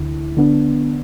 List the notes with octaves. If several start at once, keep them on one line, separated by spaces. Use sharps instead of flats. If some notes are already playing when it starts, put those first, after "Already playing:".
Already playing: D2 D3 E4
D3 B3 D4